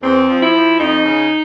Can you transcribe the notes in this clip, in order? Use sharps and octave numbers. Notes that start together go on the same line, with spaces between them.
E2 C4
F3
E4
F3
F2 D#4
C#3